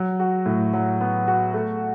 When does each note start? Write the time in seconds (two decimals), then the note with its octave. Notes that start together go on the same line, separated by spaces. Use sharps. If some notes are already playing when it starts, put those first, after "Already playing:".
Already playing: F#3
0.20 F#4
0.46 A2
0.73 F#3
1.01 B3
1.27 F#4
1.54 A3